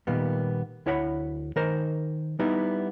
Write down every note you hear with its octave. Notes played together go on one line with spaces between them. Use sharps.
A#2 D#3 G3 A#3 B3
D2 E4 C#5 F#5 G#5 B5
D#3 A#4 C5
G3 B3 D#4 E4